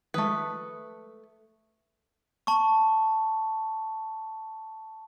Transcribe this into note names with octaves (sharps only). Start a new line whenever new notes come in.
D#3 F3 G#3 A3 B4 D#6
A5 C#6